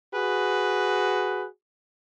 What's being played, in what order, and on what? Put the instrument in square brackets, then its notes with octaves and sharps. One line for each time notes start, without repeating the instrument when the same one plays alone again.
[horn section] F#4 G#4 B4